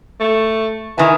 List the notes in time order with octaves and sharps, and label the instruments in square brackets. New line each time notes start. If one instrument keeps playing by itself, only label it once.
[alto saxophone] A3
[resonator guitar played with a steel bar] D#3 G#5 [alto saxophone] E3